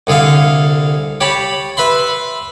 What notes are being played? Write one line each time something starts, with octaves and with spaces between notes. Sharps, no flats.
C2 D3 G#4 A4 F5
G4 C#5 A5 B5
B4 E5 B5 C6